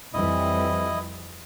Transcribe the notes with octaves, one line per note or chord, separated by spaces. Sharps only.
F2 E3 G3 E4 D#5